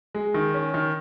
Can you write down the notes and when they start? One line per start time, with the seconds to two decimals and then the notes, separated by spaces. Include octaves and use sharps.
0.14 G#3
0.34 D#3
0.54 C#4
0.74 D#3